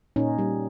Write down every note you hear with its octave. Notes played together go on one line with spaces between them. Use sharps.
A#2 C#4 D#4
G3